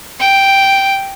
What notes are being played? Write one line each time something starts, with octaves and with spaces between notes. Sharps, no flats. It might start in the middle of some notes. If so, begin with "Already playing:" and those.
G5